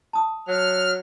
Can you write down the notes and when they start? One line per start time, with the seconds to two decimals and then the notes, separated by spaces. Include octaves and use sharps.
0.13 A5 D#6
0.48 F#3 F6